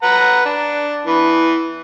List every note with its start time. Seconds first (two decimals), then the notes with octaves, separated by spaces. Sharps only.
0.03 B4 F#5 A#5
0.45 D4
1.06 E3 B3